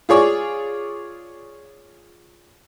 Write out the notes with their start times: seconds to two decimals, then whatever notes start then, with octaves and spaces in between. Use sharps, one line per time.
0.09 F4 G#4 C#5 D5